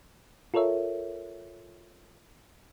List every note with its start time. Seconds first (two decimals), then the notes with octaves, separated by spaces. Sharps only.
0.54 F4 A4 A#4 C#5 E5